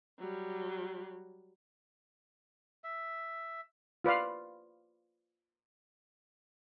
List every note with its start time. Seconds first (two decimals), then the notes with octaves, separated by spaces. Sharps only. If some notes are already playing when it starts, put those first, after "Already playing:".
0.19 F#3 G3
2.84 E5
4.04 F4 B4 D5 F5